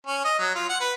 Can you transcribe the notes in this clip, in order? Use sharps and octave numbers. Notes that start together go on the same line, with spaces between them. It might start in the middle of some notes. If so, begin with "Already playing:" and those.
C#4
D#5
F#3
F4
F#5
B4